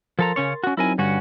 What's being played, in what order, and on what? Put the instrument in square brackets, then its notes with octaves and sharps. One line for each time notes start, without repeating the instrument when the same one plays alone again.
[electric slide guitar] F3 A4 A#5 [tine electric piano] A#4 C6 A6
[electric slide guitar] C#3 C#4 C#5
C#4 F#4
[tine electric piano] F#3 C4 D#4 [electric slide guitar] E4 A#4 G#5
[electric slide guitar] G2 C#4 F#4 [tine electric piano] D3 G3